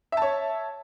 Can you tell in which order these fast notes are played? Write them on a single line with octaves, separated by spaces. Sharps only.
E5 A5 C#5